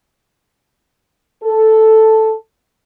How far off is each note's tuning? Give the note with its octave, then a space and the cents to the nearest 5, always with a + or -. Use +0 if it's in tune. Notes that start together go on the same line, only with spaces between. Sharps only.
A4 +0